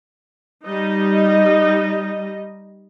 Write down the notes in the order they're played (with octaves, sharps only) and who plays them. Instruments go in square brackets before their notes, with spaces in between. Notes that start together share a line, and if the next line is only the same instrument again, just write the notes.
[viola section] G3 D#4 D#5